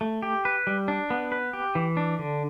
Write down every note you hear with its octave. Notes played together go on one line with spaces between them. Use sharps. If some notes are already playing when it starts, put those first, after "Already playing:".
A3
G4
B4
G3
D4
B3
B4
G4
E3
D4
D3